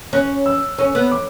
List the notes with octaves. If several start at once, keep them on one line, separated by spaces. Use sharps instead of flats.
C#4 F#6
E6
C#4 E6
B3
D6